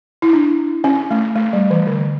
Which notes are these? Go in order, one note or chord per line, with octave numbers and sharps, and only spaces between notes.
E4
D4
C#4
A3
A3
G3
E3
D3